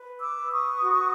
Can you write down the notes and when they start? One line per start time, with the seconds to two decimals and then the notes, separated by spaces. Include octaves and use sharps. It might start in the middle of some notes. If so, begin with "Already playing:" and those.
Already playing: B4
0.19 D6 E6
0.36 B4
0.51 C#6 D#6
0.82 F#4